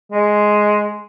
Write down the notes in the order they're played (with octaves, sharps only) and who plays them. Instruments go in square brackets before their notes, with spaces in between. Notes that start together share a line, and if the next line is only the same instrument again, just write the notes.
[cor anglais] G#3